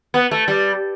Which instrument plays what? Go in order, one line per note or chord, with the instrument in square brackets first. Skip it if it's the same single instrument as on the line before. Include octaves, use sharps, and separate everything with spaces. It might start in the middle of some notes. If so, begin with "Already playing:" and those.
[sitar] B3
A3
G3